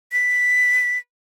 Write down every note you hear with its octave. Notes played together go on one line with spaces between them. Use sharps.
B6